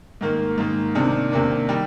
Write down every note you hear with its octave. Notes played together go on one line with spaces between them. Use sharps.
G#2 D#3 A#3
G#2 D#3 A#3
C3 D#3 A#3 D4
C3 D#3 A#3 D4
D#3 G3